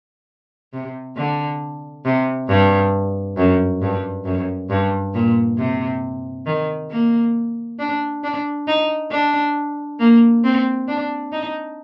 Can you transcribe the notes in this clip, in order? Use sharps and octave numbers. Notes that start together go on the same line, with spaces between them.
C3
D3
C3
G2
F#2
G2
F#2
G2
A#2
C3
D#3
A#3
D4
D4
D#4
D4
A#3
C4
D4
D#4